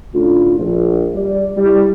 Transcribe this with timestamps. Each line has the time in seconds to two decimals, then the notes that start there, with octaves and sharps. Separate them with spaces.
0.14 A2 D3 A3 C#4 D4 F4
0.58 A#1
1.14 G3 D5
1.57 G3 E4